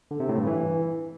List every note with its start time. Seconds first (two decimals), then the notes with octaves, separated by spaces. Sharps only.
0.11 D3
0.20 C3
0.29 A2
0.38 G2
0.47 E3